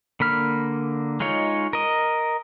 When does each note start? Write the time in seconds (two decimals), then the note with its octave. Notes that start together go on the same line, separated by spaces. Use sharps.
0.20 D3 A#3 B5 F6
1.20 G#3 D#4 F4 C#5
1.73 A#4 D#5